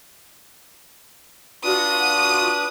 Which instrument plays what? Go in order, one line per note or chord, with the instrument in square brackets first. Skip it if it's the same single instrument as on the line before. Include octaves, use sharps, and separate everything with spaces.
[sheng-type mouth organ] D4 B4 [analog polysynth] F4 F#4 [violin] D#6